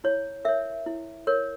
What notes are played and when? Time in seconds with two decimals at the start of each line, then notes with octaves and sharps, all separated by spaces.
0.04 E4 C#5
0.45 A#4 C#5 E5
0.86 E4
1.27 A#4 C#5